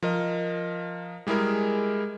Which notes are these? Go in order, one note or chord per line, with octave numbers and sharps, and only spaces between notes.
F3 A#4 D#5
G3 G#3 E4 G#4 A#4